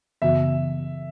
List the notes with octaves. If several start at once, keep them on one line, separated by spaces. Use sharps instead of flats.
F#2 C#3 E3 B3 F#4 E5